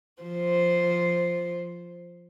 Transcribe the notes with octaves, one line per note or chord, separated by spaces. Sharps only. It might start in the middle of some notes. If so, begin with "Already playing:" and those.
F3 C5